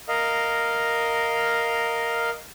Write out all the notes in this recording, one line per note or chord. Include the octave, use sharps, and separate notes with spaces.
A#4 D#5 F5